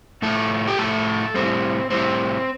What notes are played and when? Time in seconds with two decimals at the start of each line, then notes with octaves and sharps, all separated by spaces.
0.22 A2 F3 A3 A4
0.67 G4
0.78 A2 F3 A3 A4
1.34 A2 G3 C4
1.90 A2 G3 C4